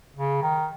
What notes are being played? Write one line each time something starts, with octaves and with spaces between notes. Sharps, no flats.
C#3
D#3